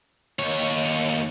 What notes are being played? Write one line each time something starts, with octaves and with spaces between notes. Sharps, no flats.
D#2 C#5